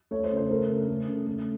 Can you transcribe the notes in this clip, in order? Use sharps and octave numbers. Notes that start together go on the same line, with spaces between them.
A3 C#5
C5
C#3
C5
A3 A#4
C#3
A3
C#3
A3